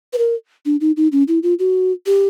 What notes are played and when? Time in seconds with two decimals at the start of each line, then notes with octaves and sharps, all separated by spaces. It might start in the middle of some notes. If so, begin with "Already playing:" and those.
0.13 B4
0.18 A#4
0.66 D4
0.81 D#4
0.97 D#4
1.12 C#4
1.28 E4
1.43 F4
1.59 F#4
2.06 G4